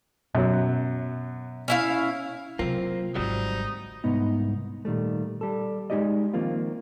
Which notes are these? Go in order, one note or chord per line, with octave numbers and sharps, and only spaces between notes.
F#2 B2 F#3
C#4 E4 F5
C3 F#3 A#3 C4 F4
G#1 D3 F#3 G3 C4 D#4
C2 G#2 B3 D#4
A#2 D#3 G3 A3
G3 A4
G#3 D#4 G4 D5 D#5
D#3 F3 A#3 C4 F4